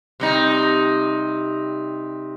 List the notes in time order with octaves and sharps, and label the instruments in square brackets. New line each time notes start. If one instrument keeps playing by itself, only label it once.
[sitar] C3 G3 D#4